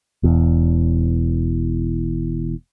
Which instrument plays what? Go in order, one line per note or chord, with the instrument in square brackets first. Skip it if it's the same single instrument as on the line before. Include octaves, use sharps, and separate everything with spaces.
[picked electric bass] E1 E2